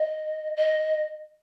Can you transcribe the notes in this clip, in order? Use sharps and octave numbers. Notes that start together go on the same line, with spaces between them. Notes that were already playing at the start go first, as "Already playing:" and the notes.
Already playing: D#5
D#5